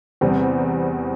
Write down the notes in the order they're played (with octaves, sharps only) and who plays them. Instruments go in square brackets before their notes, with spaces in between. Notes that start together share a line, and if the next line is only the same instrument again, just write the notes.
[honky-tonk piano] E2 C3 G3 C4